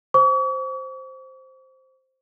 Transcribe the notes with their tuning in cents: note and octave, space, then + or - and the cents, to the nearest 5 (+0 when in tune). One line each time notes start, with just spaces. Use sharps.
C5 +0 C#6 +45